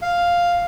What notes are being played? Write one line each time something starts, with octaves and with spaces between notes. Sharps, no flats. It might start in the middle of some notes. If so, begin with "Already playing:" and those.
F5